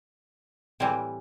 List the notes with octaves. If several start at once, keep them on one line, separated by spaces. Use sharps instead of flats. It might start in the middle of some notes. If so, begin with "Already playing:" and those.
A2 E3 G3 C4 E4